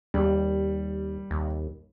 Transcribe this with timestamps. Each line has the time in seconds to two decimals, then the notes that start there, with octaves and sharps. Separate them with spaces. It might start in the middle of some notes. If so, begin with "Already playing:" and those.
0.14 D#2 G3
1.31 D#2